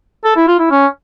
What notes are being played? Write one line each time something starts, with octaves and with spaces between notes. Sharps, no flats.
A4
E4
F4
E4
C#4